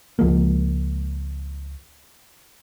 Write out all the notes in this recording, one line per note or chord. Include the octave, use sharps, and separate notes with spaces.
C#2 F3 G#3 A#3